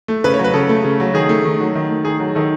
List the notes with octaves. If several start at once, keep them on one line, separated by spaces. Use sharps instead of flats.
A3
C#3 B4
C#5
F#3
B4
C#3 A4
A3
C#3
F#3
D#3 G#4
A3
D#3
F#3
D#3
A3
D#3 G#4
F#3
D#3 A4